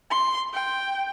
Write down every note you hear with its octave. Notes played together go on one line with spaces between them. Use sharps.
C6
G5